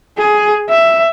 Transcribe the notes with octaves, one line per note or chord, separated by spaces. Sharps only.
G#4
E5